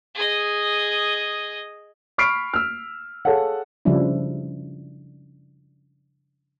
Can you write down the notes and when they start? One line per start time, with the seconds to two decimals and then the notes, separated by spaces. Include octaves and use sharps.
0.14 G#4 D#5
2.18 B5 C#6 F6 B6 C7 D7
2.53 E6 F6
3.25 G#4 A4 C#5 F5 F#5
3.85 C#3 F3 G3 D4 E4